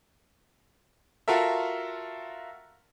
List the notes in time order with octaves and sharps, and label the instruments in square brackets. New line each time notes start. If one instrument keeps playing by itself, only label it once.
[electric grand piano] F4 F#4 A4 A#4 E5